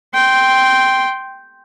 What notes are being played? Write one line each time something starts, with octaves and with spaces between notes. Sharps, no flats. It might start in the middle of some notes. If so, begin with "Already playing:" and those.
G5 C6